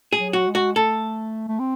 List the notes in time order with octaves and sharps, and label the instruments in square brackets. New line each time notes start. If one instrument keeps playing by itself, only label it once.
[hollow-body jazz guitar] G#4
[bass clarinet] F#3
[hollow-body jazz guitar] F#4
[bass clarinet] G#3
[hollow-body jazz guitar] F#4
[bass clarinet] A3 [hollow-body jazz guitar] A4
[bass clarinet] A3
C4